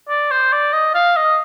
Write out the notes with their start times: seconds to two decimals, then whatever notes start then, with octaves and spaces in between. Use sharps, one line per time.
0.09 D5
0.31 C5
0.52 D5
0.73 D#5
0.94 F5
1.16 D#5